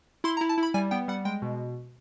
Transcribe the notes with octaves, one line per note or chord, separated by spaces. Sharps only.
E4 C6
A#5
E4
A5
E4
B5
G3 G#5
B3 G5
G3 F#5
G#3 G5
B2